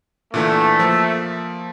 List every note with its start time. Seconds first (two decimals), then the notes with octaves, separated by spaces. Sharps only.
0.34 A#2 D3 E3 A3
0.79 F3 A#3